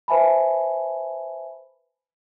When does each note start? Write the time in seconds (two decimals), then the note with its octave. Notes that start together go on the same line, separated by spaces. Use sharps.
0.08 B4 C5 E5 G#5 A5 B5